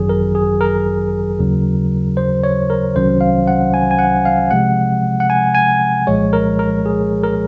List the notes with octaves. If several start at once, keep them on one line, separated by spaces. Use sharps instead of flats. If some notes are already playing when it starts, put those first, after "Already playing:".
Already playing: G#1 F#2 D#3 F#3 G#4
A#4
G#4
A#4
D#2 C#3 F#3
C5
C#5
A#4
C2 C3 D#3 F#3 C#4 C5
F5
F#5
G#5
G#5
F#5
F5
C3 F3 G#3 F#5
F#5
G#5
G#5
C2 A#2 F3 G#3 C#5
A#4
A#4
G#4
A#4